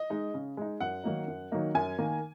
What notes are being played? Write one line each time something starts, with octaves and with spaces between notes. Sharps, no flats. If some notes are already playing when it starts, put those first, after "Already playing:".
Already playing: D#5
G#3 D#4
C#3
G#3 D#4
F#2 F#5
D#3 F#3 A#3 D#4
F#2
D#3 F#3 A#3 D#4
F#2 G#5
D#3 A#3